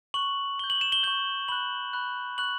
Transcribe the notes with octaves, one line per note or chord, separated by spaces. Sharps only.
C#6 F#6 F#7
C#6 G6 G7
F#7
E7
G7
C#6 G6 G7
B5 F#6 F#7
B5 F#6
C#6 F#6 F#7